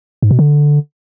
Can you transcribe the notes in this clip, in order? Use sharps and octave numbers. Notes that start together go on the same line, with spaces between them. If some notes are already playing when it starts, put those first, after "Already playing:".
G#2
B2
D3